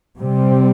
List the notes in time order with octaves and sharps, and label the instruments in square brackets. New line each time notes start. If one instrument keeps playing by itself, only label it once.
[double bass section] C3 G3 C4